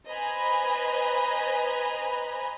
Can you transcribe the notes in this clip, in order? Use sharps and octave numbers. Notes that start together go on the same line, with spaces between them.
B4 C5 D#5 G#5 A#5 B5